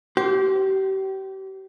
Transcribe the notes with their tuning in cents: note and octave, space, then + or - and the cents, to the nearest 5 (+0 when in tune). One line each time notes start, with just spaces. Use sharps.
G4 -35 C5 +0